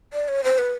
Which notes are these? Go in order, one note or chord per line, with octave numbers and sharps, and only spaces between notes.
D5
C#5
C5
B4